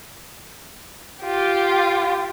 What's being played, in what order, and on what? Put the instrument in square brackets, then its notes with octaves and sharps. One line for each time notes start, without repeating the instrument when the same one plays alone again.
[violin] F4 G4